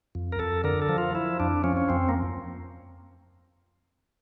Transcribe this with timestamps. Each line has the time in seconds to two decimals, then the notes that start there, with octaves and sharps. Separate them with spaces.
0.15 F2
0.32 A#4
0.39 F2 A4
0.64 D3 A#4
0.82 A4
0.89 F3
0.98 F4
1.15 F3 E4
1.40 F2 D4
1.64 F3 C#4
1.77 C#4
1.89 F2 C4
2.09 A#3